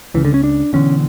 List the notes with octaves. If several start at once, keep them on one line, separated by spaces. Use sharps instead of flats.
C#2 C#3 E3
D3
C#4
D4
E1 E2 D3 C#4